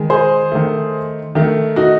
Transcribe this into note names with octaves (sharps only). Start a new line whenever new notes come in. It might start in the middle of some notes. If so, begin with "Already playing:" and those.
Already playing: D#3 G#3
G#4 C5
D#3 A3
D#3 A3
D#4 F#4